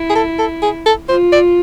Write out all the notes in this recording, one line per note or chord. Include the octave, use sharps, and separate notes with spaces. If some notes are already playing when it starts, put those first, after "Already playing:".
Already playing: E4
G#4
A4
A4
G#4
A4
F4 C5
D5